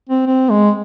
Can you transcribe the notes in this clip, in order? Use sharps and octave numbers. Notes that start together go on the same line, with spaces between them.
C4
C4
G#3